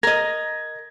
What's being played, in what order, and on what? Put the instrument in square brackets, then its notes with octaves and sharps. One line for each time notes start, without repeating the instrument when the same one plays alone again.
[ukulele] A#4 D#5 [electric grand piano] G#6 A#6